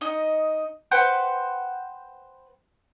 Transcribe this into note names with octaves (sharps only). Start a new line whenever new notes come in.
D#4 D#5
B4 C5 F#5 G5